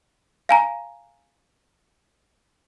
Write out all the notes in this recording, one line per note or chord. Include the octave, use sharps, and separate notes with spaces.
F5 G#5 A#5